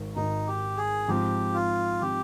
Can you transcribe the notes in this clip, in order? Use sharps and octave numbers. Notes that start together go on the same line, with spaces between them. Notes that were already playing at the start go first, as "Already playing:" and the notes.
Already playing: G#1 G#2 D#3
G#1 G#2 D#3 D#4
G4
G#4
G#2 F3 C4 G4
F4
F3 C4 G4